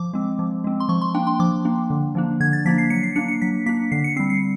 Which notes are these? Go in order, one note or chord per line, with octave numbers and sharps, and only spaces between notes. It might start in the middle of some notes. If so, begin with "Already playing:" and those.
Already playing: F3 D6
G#3 C4
F3
G#3 C4
C6
F3 C#6
C6
A#3 D4 G5
C6
F3 D6
A#3 D4
D3
F3 A#3 D4
D3 G#6
A6
F3 A#3 D4 B6
C7
F#3 C#7
C7
A#3 D4 C#7
C#7
F#3 B6
A#3 D4 B6
D3 C7
C#7
G3 C4 C7
C7